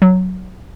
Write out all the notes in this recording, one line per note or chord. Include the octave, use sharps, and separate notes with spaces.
F#3